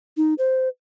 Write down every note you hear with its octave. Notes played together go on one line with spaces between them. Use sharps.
D#4
C5